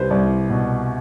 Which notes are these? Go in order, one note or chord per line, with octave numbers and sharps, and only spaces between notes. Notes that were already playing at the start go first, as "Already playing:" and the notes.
Already playing: C2 G3 B4 C5
C2 D5
B2